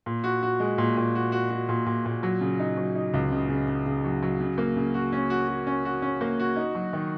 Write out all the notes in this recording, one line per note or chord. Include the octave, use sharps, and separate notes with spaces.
A#2
F#4
F#4
G#3
A#2
A#2
F#4
F#4
F#4
A#2
A#2
A#2
F#3
C#3
D#4
F#3
D#4
C#2
C#3
C#3
C#3
C#3
F#3
F#3
C#3
A#3
C#3
F#4
C#4
F#4
F#4
C#4
F#4
C#4
A#3
F#4
D#4
F#3
D#3